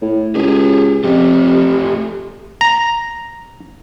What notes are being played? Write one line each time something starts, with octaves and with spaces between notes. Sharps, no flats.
A2
C#2 G4 G#4
F2 A3 G4
A#5